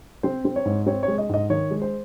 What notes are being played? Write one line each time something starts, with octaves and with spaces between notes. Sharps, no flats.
C4 C5
C4
C#5
G#2
C4 C#5
C#5
G#3
D#5
G#2 D#5
D#3 C#5
G#3
C5